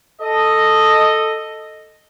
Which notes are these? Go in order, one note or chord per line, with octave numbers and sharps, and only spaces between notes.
A4 D#5